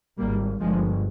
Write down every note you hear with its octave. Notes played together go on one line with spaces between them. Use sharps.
G#1 G#2 G3 A#3
G1 G2 F3 G#3